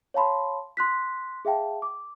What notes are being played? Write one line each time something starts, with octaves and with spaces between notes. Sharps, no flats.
C#5 F5 A5 B5 C6
C6 F#6 B6
G#4 E5 F5 G5 A5
D6